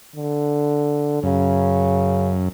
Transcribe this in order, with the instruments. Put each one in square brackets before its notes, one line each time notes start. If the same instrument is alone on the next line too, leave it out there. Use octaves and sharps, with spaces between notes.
[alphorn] D3
[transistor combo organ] F#2 [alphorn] C#3